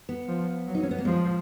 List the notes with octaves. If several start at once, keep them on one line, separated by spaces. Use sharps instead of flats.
B3
F3
F#3
D#4
C#4
B3
A#3
F3 G#3